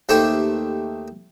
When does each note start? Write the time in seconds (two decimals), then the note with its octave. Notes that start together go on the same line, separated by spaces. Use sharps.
0.09 D#2 A3 G4 A4 C5 G5